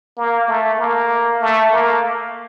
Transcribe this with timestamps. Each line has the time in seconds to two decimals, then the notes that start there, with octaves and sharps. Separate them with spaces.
0.17 A#3
0.48 A3
0.79 A#3
1.42 A3
1.72 A#3